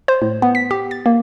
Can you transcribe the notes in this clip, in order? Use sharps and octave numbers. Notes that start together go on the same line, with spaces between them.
C5
A2
B3
B6
G4
A6
A#3